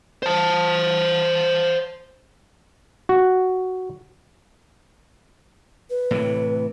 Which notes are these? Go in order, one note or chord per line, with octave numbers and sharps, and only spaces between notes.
C5 A5
F#4
B4
A2 C3 E3